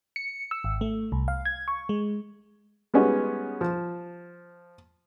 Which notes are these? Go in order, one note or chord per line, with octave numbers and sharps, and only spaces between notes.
C#7
E6
G#1
A3
C2
F5
G#6
C#6
G#3
G3 G#3 B3 C#4 D#4 F#4
F3